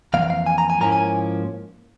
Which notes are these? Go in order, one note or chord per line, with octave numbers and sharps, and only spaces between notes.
F2 E3 A#3 F5
F5
G#5
A#5
G#5
G#2 F3 A#3 C#4 E4 A#5
G#5